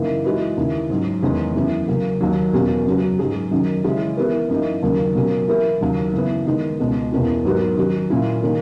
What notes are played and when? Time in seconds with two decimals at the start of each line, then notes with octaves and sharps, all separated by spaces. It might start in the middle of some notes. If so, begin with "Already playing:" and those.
Already playing: F#2 C#3 E3 A#3 D#4
0.24 E3 G#3 D#4 F#4 B4
0.57 D#2 C#3 E3
0.90 G#2 F#3 C#4
1.22 E2 D#3 G#3 C#4
1.56 F#2 E3 B3
1.88 C#3 F#3 A#3 C#4
2.21 D#2 D#3 F#3
2.53 E2 B2 A#3 C#4 F#4
2.86 F#2 C#3 F#3 B3 F#4
3.19 G#2 F#3 C#4 G#4
3.51 F#2 D#3 F#3 C#4
3.84 C#3 E3 G#3 C#4 G#4
4.17 E3 B3 E4 A#4
4.50 F#2 E3 A#3 D#4
4.83 D#2 C#3 F#3 A#3
5.15 B2 F#3 A#3 C#4
5.48 E3 A#3 E4 A#4
5.81 D#2 C#3 F#3
6.13 F#2 C#3 E3 B3
6.47 D#3 G#3 B3 D#4
6.79 C#2 B2 G#3
7.12 E2 B2 A#3 C#4 E4
7.45 G#2 F#3 B3 F#4 A#4
7.77 D#3 F#3 C#4 F#4
8.10 A#2 F#3 C#4 E4
8.43 D#3 A#3